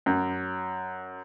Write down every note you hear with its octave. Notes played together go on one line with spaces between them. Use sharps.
F#2